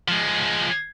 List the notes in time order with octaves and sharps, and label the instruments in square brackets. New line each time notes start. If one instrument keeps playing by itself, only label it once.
[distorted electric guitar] F3 G#3